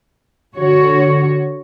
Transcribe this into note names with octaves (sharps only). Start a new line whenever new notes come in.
D3 F#4 C#5